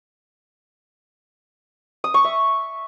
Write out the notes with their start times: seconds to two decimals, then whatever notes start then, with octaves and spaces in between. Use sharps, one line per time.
2.04 D#6
2.14 C#6
2.24 E5